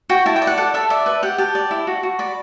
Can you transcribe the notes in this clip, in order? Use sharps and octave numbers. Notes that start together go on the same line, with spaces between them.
F#4 G5
E4 A5
G5
D5
F#5
A4 F#5
A4 E5
D5 E5
B4
G4 F#5
G4 A5
D5
E4
F#4
F#4
D5 B5